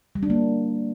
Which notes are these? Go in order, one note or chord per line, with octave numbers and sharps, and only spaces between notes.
G3
D4
A#3